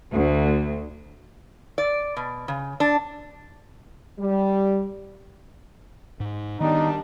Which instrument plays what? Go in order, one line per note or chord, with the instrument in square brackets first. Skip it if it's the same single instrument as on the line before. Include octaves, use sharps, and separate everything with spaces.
[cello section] D2
[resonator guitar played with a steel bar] D5
B2
C#3
D4
[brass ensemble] G3
[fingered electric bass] G#2
[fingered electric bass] D#3 B3 [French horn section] G3 D4 [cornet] D#4